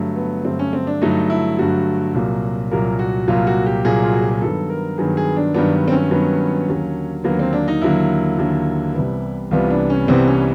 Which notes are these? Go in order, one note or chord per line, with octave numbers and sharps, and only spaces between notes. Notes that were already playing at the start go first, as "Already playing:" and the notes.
Already playing: G2 D3 F#3 A3
B3
G2 D3 F#3 A3 C4
C#4
C4
D4
G2 D3 F#3 A3 D#4
E4
G2 D3 F#3 A3 F#4
C2 A#2 F#3 A#3
C2 A#2 F#3 A#3 A#4
F#4
C2 A#2 F#3 A#3 F4
F#4
G4
C2 A#2 F#3 A#3 G#4
F4
F#4
G4
G#4
G2 D#3 F#3 B3 A4
A#4
G2 D#3 F#3 B3 G#4
G#4
D4
G2 D#3 F#3 B3 D4
C4
C#4
G2 D#3 F#3 B3
D#2 D3 F#3 A#3
D#2 D3 F#3 A#3 B3
C4
D4
D#4
D#2 D3 F#3 A#3 E4
D#2 D3 F#3 A#3
C2 C3 E3 G3 B3
C2 C3 E3 G3 B3 F4
D4
C#4
C2 C3 E3 G3 B3 C4
C#4